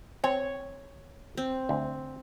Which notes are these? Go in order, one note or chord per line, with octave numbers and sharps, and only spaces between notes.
C4 C#5
C4
D2